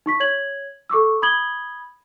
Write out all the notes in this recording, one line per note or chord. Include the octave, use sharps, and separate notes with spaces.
D#4 C#6 B6
C#5 G#6 F#7
A4 C#6 D6 E6
B5 D#6 G#6 F#7 G7